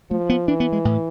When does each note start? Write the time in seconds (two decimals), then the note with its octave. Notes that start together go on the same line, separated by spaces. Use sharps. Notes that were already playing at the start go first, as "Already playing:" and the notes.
0.10 F3 A3
0.30 B3
0.48 E3 D4
0.60 B3
0.72 G#3
0.85 A2